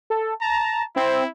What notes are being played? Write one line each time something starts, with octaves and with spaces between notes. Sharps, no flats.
A4
A5 A#5
C4 E4